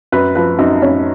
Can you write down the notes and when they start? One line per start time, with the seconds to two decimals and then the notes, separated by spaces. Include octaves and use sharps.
0.12 F#2 B4
0.35 F3 B4
0.59 F#2 D#4
0.82 F#2 C#4